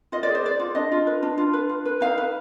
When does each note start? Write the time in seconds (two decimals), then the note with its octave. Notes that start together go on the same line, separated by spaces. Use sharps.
0.12 F4 D#5
0.23 D5
0.29 G#4
0.35 C5
0.44 B4 D5
0.60 F4
0.75 D4 D#5
0.92 F4
1.07 B4
1.23 D4
1.38 F4
1.53 B4
1.69 F4
1.85 B4
2.01 D#4 F5
2.18 B4